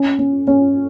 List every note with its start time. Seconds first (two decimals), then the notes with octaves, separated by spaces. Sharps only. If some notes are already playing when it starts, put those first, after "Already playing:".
Already playing: C#4
0.19 C#4
0.47 C#4